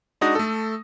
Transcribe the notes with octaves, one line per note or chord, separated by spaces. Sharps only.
G#3 D4 D#4 F#4 D#6 A#6
A3 A4